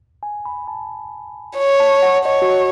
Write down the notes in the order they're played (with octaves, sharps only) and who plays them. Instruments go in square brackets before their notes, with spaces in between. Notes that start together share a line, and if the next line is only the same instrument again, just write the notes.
[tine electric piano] G#5
B5
A5
[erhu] C#5
[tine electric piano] A5
F#5
[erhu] C#5 [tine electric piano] D#5
[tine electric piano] F#4